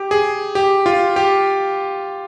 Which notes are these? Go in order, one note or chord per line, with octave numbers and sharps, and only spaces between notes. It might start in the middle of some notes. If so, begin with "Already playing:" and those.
Already playing: G4
G#4
G4
F4
G4